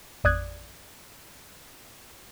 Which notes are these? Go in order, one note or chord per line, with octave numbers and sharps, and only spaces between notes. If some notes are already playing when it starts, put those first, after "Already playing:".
A1 F2 D5 D#6 F#6 G#6